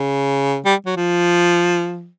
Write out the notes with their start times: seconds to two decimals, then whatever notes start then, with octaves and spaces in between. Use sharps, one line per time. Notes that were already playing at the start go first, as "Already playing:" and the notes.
Already playing: C#3
0.65 G3
0.86 F#3
0.97 F3